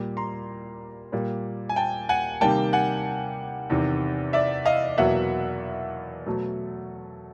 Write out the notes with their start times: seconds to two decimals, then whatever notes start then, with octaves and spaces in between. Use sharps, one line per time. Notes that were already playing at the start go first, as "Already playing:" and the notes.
Already playing: A#2 G3 A#3
0.17 A#5 C6
1.12 A#2 G3 A#3
1.69 G#5
1.76 G5 A5
2.09 F#5 G#5
2.41 C3 D#3 G3 A#3 G5 A5
2.73 F#5 G#5
3.70 E2 C3 D#3
4.33 D5 E5
4.65 D#5 F5
4.98 E2 B2 F#3 A#3 E5 F#5
6.26 B2 F#3 A3